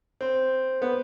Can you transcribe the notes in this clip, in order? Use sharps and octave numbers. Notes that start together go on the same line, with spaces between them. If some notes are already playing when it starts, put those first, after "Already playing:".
C4
B3